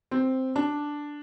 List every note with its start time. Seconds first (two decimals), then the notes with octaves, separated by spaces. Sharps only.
0.11 C4
0.56 D4